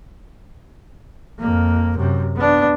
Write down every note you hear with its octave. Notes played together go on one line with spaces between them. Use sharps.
F2 A#3
F#2 C3
B3 D4